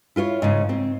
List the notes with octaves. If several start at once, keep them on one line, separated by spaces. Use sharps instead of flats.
E4 F4 B4 C#5
G#2 C#3
C4